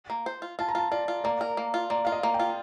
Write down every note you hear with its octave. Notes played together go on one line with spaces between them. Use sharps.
A#3
C5
F4
F4 A5
A#5
F4 A5
F4 D5
F4
A#3 D5
A#4
A#3
F4
A#3 D5
F4 F5
D#5
A#3
G5
F4